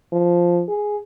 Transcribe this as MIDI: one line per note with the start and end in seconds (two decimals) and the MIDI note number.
0.13 0.63 53
0.69 0.98 68